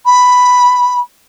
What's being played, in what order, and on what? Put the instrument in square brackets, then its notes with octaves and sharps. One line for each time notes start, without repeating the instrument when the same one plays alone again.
[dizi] B5